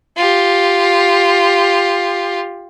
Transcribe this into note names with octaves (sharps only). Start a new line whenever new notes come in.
F4 G4